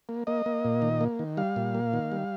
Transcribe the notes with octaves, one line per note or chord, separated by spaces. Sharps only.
A#3
A#3 D#5
A#3
A#2
D#3
A#3
D#3
G3 F5
A#2
A#3
D#3
G3